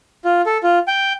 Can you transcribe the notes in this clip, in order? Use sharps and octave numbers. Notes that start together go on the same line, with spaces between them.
F4
A4
F4
G5